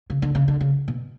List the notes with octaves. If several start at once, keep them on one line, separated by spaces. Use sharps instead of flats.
C#3
D3
C#3
D3
C#3
B2